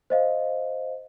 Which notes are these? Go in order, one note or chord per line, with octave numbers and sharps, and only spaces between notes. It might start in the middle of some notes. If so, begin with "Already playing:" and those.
C5 D#5 F5